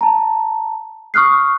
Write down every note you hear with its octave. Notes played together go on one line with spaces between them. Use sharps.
A5 A#5
C#6 D#6 F6 F#6 C7